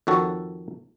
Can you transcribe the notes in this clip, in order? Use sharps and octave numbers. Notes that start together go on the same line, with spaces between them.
F2 D#3 F#4 A4 C#5